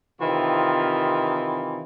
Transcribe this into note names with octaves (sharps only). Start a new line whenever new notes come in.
C3 D#3 E3 C4 F4